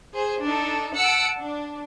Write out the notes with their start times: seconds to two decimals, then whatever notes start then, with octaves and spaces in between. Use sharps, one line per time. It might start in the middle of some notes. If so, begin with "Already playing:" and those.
0.13 G#4 C5
0.44 D4 D#4 A4
0.97 F#5 A5 E6 C#7 D7
1.39 D4